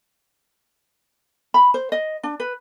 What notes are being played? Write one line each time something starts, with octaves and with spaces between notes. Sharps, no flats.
B5
C5
D#5
D4
B4